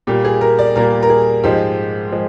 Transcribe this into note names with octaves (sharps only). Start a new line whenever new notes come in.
A#2 G3 A#3 G4
G#4
A#4
D5
A#2 G3 A#3 A#4
A#4
G#4
G#2 F3 G#3 G4
F3 G#3